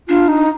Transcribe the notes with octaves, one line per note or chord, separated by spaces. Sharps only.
D4 F4
D#4